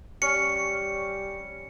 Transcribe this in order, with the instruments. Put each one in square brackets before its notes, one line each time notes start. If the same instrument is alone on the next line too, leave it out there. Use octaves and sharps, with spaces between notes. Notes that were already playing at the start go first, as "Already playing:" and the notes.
[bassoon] G3 [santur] C#4 [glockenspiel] C#7